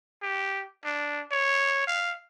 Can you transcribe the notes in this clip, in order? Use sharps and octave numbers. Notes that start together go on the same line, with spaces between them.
G4
D4
C#5
F5